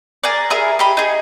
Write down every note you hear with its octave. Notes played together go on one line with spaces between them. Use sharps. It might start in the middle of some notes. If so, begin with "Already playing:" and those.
G#4 A#4 D5
E4 G#4 A#4
G4 D#5 B5
D#4 G#4